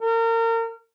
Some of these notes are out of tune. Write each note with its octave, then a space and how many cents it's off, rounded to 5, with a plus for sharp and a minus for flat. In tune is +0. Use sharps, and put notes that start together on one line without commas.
A#4 -30